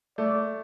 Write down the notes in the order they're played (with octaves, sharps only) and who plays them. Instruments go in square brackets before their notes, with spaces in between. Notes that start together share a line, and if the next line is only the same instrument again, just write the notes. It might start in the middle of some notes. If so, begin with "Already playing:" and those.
[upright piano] A3 [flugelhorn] D5